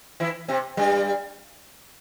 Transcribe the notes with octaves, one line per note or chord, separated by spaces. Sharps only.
E3 E4
C3 C4
G2 G3